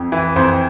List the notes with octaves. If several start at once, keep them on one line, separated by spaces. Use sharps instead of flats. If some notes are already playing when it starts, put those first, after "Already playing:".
Already playing: F2
E3
F2 C5